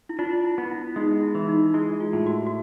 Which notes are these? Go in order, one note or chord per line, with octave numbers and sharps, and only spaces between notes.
E4
D4 F4
E4
B3
E4
G#3 D#4
E4
E3
D#4
G#3 E4
F4
A2
F#4
F#4